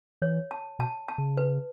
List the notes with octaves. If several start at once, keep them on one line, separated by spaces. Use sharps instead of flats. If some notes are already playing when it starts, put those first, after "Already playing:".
E3 C#5
A5
B2 A5
A5
C#3
B4